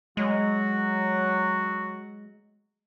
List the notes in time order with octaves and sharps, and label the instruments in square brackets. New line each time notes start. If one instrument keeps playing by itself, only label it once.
[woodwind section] F#3 F#4 [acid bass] G#3